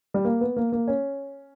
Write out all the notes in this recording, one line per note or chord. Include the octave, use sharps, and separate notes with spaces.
G3
A#3
B3
A#3
A#3
C#4